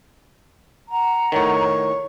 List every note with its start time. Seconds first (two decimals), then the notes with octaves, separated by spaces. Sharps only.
0.89 F#5 A#5
1.32 A2 D#3 C#5